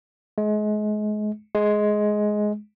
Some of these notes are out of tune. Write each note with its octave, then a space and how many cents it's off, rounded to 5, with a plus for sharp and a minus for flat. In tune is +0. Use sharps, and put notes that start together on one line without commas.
G#3 +35
G#3 +15